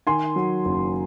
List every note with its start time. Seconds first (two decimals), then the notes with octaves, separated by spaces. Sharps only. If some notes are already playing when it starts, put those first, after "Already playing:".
0.07 D#3 G#5 C6
0.36 F#3
0.65 F#1